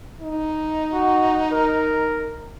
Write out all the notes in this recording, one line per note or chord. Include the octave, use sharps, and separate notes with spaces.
D#4
F#4
A#4